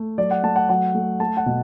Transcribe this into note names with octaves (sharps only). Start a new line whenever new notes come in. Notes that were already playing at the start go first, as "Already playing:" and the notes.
Already playing: A3
F#3 D5
F#5
A3 A5
F#5
F#3 F#5
A3
A3 A5
F#5
B2